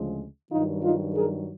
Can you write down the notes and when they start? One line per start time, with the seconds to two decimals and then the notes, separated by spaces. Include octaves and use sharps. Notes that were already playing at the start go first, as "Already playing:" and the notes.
Already playing: D2 C#3 F3 G#3
0.51 G2 D#3 F#3 D#4 F4
0.83 D#4 F4
1.15 G#4 A#4